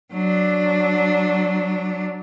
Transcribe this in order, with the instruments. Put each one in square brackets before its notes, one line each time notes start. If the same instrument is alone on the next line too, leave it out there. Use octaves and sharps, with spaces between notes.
[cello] F#3 D4